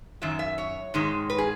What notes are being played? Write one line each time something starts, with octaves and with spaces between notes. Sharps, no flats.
F#2 D#3 F#3 E5
E5
C#5
G#2 D#3 G#3
B4
G#4